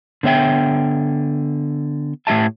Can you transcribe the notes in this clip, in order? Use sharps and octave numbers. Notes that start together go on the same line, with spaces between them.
D3 B3 C#5 E5 G5
A2 D#4 G4 E5 A5